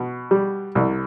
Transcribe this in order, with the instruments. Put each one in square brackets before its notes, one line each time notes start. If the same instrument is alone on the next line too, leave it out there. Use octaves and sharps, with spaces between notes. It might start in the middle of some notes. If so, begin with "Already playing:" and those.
Already playing: [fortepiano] B2
G3
C2